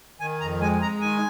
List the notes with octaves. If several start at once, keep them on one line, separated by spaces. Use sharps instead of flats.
D#3 G#5
F2 A#5
G#3 G#5
G#3 A#5
D#3 G#5